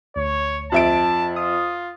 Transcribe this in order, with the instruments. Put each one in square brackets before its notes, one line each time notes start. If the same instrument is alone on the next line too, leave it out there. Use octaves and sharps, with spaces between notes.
[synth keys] D2 [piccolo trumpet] C#5
[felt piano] F2 E5 D7 [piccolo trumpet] A5
[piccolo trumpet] F4 [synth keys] D#6